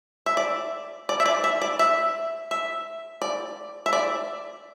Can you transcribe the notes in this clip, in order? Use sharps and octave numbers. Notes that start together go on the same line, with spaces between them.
E5
D5
D5
E5
D5
E5
D5
E5
E5
D5
E5
D5